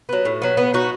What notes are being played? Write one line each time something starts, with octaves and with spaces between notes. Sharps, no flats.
F#3 B3
A2
F#3 B3
B3
D#4 F#4